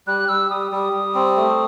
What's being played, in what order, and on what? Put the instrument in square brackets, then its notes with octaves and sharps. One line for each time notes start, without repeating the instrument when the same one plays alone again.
[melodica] G3 [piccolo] F#6
[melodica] G3 [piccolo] E6
[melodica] G3 [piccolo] D#6
[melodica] G3
G3
C4
A3